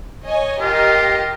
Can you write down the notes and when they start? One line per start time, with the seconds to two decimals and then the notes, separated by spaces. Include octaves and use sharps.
0.24 C#5 D#5 G#5
0.61 F4 G4 A#4 D#5